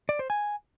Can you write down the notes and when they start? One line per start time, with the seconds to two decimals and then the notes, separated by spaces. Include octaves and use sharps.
0.09 D5
0.19 C5
0.30 G#5